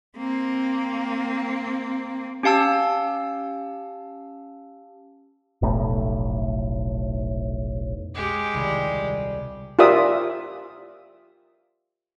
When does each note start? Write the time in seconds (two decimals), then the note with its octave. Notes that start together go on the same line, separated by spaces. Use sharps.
0.17 A#3 C4
2.43 C#4 G4 F5 A5 E6
5.62 F1 B1 A2 A3
8.15 G#3 G4
8.53 D#1 C2
9.79 F4 G4 A#4 D5 E5 D#6